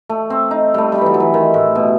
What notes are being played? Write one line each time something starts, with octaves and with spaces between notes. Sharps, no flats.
A3
C4
D#4
G3 A3
G3
E3 F#3
F#3
E3
D#3
A2
B2